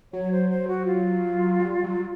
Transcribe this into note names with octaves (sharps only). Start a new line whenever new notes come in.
F#3 C#5
C5
C5
F#4
F4
G3
F#3